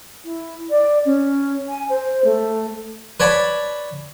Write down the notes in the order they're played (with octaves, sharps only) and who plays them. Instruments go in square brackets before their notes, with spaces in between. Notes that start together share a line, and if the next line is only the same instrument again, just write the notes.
[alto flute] E4
D5
C#4
G#5
C5
A3
[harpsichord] B4 C#5 D5 A5 B5